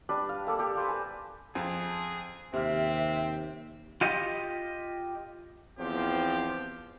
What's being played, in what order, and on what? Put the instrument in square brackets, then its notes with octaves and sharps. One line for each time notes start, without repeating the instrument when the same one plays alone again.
[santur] G3 D4 B4
F5
A#3 A4 D5
G4 A4
B4 C5 F5
A#4 G#5
[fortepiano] F2 F4 A5 [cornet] G#4
[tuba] D#2 [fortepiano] C3 F6 [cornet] C4 [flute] E5
[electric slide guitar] F4 G4 D#5
[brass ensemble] E2 F3 C4 G4